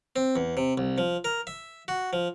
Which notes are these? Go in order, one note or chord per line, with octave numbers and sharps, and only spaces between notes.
C4
E2
C3
C2
F3
A#4
E5
F#4
F3